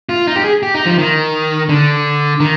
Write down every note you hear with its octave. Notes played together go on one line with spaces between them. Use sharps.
F4
D#4
G4
G#4
G4
D#4
F3
D#3
D3
D#3